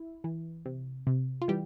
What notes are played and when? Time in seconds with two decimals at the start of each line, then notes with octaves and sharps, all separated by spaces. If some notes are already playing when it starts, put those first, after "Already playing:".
Already playing: E4
0.24 E3
0.66 C3
1.07 C3
1.42 F4
1.48 E3 G3 G4